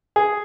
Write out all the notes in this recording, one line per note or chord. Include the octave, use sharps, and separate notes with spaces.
G#4